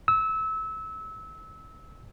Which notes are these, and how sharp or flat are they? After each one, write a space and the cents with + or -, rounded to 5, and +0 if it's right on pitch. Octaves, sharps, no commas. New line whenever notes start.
E6 -25